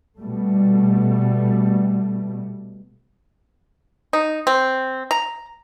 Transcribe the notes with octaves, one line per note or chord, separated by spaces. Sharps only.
B2 G3 A3
D#4
C4
A#5